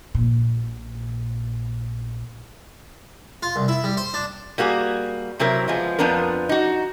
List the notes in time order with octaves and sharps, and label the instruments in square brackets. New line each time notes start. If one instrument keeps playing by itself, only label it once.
[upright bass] A#1 A#2
[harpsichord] F4
C2
E4
G3
C5
D4
[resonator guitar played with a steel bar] G3 A#3 F#4 G#4
C3 F#3 C4 E4 A#4
F3 G#3 B3
F2 F3 B3 D4 A#4
D#4 F#4